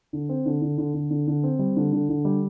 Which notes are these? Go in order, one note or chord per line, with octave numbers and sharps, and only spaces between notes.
D3
C4
D3
D3
D3
D3
D3
D3
C4
G3
D3
D3
D3
G3